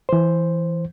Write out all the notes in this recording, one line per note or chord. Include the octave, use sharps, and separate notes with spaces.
E3 C5